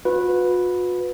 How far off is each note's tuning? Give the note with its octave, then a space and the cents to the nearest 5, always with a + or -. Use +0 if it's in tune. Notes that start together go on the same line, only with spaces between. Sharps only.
F#4 -45 B4 +0